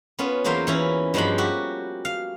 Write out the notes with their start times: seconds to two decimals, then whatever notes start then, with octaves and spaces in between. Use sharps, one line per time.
0.19 B3 C#4 F4
0.44 E2 F#3 A#3 F4 C5 E5
0.67 E3 C#4 E4
1.14 G2 F3 G#3 A#3 F#4 B5
1.38 F#4 G4 E5
2.05 F5